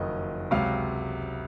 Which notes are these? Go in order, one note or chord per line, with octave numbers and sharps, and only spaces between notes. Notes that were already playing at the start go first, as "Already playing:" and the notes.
Already playing: F#1 F2 D#3 F#3 D#5
C#2 C3 F#3 F5